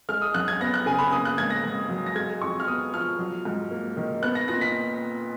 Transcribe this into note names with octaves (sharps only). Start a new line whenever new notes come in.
G#3 F6
D#6
F#2 F#6
G#6
B3 A#6
F#6
C#3 G#5
B5
A#3 D#6
F#6
G#2 G#6
A#6
G#2
F#3
A#6
G#3 G#6
F2 C#6
F6
B3 D#6
F3 F6
F#3
G#2
A#3
D#3
B3 F#6
A#6
A#2 A#6
B6